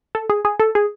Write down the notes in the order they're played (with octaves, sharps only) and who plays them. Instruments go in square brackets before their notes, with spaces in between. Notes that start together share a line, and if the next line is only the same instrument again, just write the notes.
[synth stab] A4
G#4
G#4
A4
G#4